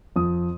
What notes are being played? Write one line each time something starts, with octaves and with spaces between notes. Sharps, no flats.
F2 D#6